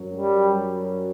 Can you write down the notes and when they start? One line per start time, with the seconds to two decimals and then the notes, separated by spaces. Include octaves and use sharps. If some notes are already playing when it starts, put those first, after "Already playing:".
Already playing: F#2 F#3
0.16 G3